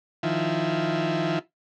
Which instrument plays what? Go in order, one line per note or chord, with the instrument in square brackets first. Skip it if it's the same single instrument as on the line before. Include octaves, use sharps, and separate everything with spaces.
[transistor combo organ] D#3 F3 E4